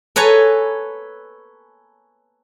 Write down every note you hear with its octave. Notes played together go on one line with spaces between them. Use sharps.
A4 B4 C#5 G#5 A#5